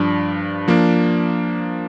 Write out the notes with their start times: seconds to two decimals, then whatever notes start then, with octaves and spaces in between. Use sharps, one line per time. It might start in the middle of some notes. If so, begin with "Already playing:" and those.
Already playing: G2 F3 D4
0.68 F3 A#3 D4